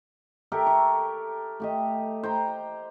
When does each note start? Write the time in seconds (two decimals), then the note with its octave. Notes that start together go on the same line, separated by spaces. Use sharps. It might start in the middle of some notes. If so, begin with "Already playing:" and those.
0.52 G4 A4 A#4 E5
0.67 C#6
1.60 A3 G4 D#5
2.23 C5 G5 A#5